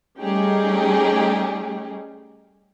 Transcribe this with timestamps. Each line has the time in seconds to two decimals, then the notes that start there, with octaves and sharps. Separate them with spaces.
0.20 G3 A3 C#4 D#4 G4 G#4